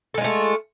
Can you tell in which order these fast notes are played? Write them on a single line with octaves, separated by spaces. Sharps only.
A4 G#3 F4 A3